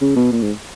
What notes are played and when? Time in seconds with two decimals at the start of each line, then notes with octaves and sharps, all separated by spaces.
0.01 C#3
0.16 B2
0.32 A#2
0.42 G#2